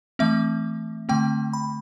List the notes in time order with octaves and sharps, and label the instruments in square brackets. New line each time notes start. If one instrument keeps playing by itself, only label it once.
[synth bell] E3 A3 C4 E5
D3 A3 C4 G5
B5